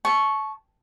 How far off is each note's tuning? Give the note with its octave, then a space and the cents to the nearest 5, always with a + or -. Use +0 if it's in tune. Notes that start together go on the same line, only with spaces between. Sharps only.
A5 -25 C#6 +0